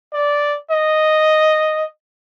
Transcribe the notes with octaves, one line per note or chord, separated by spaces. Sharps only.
D5
D#5